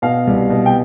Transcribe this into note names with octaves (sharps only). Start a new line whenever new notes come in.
B2 F5
C2
B2
G5